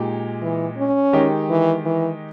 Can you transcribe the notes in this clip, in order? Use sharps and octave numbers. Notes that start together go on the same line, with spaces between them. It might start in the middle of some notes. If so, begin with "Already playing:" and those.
Already playing: A#2 G#3 D#4 G4
E3
C#4
D#3 G#3 D#4 G4
E3
E3